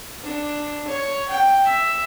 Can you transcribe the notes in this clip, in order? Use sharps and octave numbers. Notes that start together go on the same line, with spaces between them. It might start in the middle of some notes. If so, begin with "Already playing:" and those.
D4
C#5
G5
E5